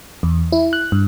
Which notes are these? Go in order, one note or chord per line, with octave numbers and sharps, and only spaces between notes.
E2
E4
F#6
G2